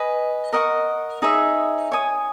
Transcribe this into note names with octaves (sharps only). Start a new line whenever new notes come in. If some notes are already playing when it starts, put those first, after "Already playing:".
Already playing: B4 D#5 G#5
A#4 D#5 F#5 C#6
D#4 G#4 C#5 E5
C#5 G#5 D#6